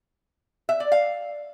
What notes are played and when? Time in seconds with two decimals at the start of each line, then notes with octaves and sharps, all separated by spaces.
0.69 E5
0.80 D5
0.92 F5